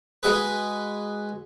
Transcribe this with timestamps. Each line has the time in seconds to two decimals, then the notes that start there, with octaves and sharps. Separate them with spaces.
0.23 G#3 F#4 G#4 B4